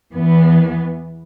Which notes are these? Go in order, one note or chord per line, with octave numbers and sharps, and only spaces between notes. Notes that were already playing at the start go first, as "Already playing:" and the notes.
E2 E3 B3